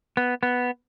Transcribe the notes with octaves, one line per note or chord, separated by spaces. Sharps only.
B3
B3